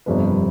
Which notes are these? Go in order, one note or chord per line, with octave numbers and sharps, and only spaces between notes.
G1 F2 C3 B4
C5